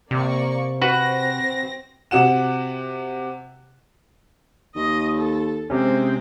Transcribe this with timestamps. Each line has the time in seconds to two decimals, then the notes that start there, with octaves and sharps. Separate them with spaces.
0.11 C3 A#3 D5 C#6
0.82 C4 F#4 B4 A#6
2.11 C3 F#4 F#5 E7
4.76 D#2 D#5
5.17 A4
5.70 C3 G#3 C4 C#4